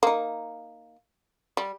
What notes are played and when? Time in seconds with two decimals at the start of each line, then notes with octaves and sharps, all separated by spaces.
0.03 A#3 D#4
1.57 G3